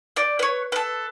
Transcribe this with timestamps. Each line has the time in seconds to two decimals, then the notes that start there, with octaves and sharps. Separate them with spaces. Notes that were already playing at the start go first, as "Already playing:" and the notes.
0.16 D5 G6
0.39 B4 C#5
0.72 A4 B4